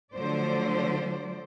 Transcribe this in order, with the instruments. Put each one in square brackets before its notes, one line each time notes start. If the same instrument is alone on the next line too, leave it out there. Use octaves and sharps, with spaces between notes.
[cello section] D3 F3 F#3 A3 C5 D5